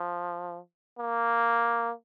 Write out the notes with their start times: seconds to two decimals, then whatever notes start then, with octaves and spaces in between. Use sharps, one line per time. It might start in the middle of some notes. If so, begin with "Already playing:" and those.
Already playing: F3
0.98 A#3